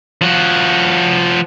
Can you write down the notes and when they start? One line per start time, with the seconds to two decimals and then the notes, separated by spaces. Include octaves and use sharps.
0.21 F3 F#4